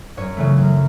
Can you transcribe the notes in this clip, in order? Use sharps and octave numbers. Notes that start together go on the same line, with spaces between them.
F#2 C#5
C#3 E3 A3
F#2